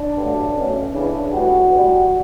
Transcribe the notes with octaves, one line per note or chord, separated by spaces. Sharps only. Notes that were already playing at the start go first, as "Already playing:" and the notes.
Already playing: D4
G2 D3 F#3 A3
B1 B2 A3 C#4
E2 C#3 E3 D4
A2 G3 B3 F#4
A1 G2 D3 G3